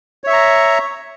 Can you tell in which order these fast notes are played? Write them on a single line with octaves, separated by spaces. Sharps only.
C#5 E5 C#6 A#5